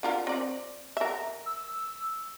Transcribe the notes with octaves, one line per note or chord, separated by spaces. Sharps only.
D3 F4 A#4
C4 D5
A#4 E5
E6